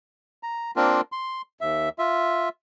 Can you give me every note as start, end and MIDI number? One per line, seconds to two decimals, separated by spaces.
0.43 0.71 82
0.76 1.01 58
0.76 1.01 60
0.76 1.01 62
0.76 1.01 65
0.76 1.01 70
1.12 1.42 84
1.61 1.89 39
1.61 1.89 76
1.99 2.49 65
1.99 2.49 76